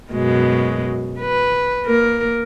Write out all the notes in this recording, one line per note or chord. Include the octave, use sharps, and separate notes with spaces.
F#2 B2 G#3
B4
A#3 A#4